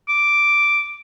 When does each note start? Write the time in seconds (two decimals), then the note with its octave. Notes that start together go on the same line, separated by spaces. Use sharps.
0.09 D6